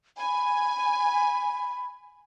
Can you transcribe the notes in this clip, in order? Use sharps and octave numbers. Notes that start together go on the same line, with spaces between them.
G#5 B5